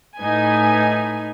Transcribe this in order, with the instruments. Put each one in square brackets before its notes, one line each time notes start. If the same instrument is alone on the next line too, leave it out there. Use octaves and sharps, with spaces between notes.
[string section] A2 D#4 B4 G#5